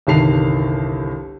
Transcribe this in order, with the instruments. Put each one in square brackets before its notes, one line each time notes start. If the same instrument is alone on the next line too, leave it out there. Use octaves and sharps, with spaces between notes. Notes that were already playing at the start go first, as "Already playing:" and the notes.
[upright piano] G1 C2 D#3 A5 C7 F7